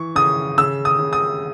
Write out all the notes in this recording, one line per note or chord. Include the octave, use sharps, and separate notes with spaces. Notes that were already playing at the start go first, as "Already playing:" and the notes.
Already playing: E3 C#6
C#3 D#6
C#3 E6
D#6
C#3
D#6